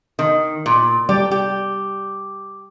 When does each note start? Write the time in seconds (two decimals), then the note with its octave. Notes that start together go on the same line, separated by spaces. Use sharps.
0.19 D#3
0.66 A#2
1.09 G3 G4 D5
1.31 G4